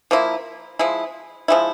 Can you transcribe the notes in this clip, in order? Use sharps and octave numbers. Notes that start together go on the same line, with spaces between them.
F3 A#3 E4
F3 G#3 E4
F3 G#3 E4